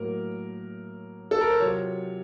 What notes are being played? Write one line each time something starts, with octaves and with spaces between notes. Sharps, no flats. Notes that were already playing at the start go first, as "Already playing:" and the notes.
Already playing: A2 F#3 A#3 A#4
A4
A#4
C5
C3 F#3 C4 F4 C#5